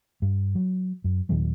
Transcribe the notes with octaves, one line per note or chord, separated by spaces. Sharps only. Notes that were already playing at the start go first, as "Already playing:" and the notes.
G2
F#3
F#2
D#2 A#2 D#3 F#3